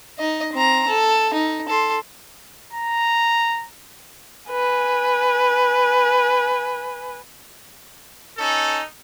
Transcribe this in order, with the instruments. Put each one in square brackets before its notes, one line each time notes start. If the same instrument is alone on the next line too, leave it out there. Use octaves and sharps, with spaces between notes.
[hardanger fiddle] D#4 D#5
C4 A#5
A4
D#4
A4 C6
[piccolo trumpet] A#5
[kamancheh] B4 G#5
[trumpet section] C#4 D#4 A4